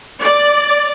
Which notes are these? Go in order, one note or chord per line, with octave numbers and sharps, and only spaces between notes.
D5